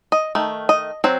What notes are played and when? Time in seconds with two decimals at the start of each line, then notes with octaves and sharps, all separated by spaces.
0.12 D#5
0.35 D#3 A3
0.69 D#5
1.04 F#3 C4 C5